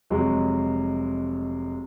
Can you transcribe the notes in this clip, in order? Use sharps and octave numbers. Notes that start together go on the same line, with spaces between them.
F1 F#3 G#3 D#5